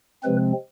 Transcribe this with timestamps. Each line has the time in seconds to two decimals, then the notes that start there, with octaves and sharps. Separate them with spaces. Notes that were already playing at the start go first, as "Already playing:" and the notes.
0.23 C3 F3 G#3 C4 B4